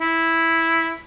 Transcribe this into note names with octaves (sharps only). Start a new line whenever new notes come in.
E4